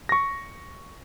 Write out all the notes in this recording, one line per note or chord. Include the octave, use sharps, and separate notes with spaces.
C#6 A#6